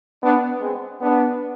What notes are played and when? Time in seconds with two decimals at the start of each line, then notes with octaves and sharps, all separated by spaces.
0.21 B3 D4
0.60 G#3 C4
1.00 B3 D4